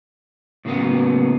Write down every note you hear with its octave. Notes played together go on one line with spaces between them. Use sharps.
A2 C#3 F#3 A#3 B3